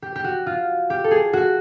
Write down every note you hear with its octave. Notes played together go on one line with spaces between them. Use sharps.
G4
G4
F#4
F4
G4
A4
G#4
F#4